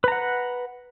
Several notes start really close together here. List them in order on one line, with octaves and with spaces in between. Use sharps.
B4 A#5 F#5